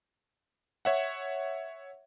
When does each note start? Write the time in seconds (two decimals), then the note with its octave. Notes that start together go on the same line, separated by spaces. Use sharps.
0.85 C#5 E5 F#5